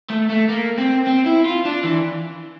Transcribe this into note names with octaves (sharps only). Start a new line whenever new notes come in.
A3
A3
A#3
C4
C4
E4
F4
D4
E3